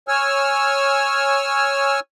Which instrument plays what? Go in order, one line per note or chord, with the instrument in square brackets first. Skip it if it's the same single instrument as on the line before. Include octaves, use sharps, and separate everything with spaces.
[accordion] C#5 G#5 E6 F6